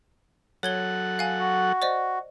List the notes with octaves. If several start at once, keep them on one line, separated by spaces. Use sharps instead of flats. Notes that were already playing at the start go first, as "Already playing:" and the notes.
F#3 A4 C#5 F#5 G#6 G7
F5 G#5
F#4
C5 D5 D#5